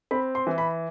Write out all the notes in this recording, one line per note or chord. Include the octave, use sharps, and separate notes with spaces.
C4 B5
C6
E3
B5